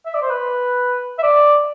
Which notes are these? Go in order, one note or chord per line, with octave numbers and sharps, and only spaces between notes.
E5
D5
C5
B4
E5
D5